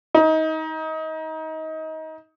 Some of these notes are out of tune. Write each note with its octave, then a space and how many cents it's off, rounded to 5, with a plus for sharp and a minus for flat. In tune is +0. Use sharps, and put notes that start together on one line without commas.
D#4 +25